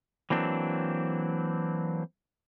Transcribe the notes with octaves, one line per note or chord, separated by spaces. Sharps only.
E3 F#3 A#3 C4 D4